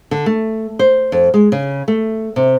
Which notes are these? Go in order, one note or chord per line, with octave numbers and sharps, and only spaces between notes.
D3
A3
C5
F2
G#3
C#3
A3
C3